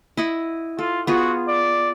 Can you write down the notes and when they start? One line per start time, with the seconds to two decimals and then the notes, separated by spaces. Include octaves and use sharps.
0.17 E4 D#5 F#5
0.79 F4 A4
1.07 B3 F4 F#4 G#4
1.48 D5